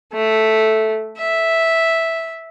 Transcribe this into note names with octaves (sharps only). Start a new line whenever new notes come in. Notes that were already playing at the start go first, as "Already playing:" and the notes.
A3
E5